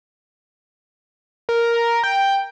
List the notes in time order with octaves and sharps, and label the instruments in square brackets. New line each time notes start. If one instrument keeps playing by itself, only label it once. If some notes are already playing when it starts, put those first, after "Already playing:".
[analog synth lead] A#4
G5